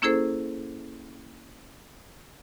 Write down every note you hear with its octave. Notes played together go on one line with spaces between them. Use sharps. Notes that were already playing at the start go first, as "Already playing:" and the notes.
A#3 C#4 E4 G#4 A4 C5